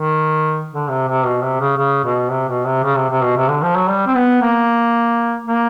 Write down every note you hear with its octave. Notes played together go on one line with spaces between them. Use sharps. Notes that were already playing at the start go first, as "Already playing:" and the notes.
Already playing: D#3
D3
C3
C3
B2
C3
C#3
C#3
B2
C3
B2
C3
C#3
C3
C3
B2
C3
D3
F3
F#3
G3
C4
B3
A#3
A#3